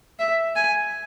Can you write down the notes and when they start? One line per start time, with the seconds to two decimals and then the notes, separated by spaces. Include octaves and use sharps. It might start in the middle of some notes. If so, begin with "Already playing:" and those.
0.19 E5
0.56 G#5